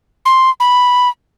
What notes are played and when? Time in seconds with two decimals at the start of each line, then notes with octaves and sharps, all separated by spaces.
0.25 C6
0.60 B5